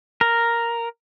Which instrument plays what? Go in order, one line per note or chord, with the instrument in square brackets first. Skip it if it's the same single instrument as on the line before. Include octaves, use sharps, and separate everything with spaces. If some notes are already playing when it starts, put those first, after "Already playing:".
[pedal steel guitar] A#4